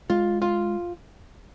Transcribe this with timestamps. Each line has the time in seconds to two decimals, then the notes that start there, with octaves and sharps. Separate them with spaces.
0.10 G#3 F4
0.42 F4